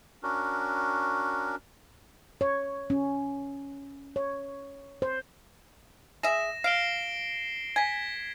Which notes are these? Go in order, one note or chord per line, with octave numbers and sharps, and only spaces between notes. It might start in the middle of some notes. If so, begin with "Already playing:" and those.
C#4 D4 F#4 A#4
C#5
C#4
C#5
C5
G#4 E5 A#6 E7
F5 C7 D7 G7
G#5 G#6 B6